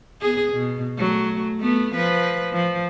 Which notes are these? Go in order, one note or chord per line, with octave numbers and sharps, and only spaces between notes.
B3 G#4
B2
F#3 A3
A3 B3
F3 B4
F3